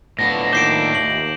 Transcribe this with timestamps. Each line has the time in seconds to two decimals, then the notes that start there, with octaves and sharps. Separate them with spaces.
0.19 A2 F3 B3 D4 A#6
0.53 A#2 D#3 D6 G6 C7 D7 E7 G7
0.95 D#2 F#7